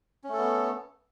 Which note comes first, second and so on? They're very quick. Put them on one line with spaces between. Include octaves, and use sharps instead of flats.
C#4 A3 A4 B3